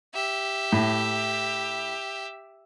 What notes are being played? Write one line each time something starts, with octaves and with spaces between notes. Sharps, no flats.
G4 E5
A2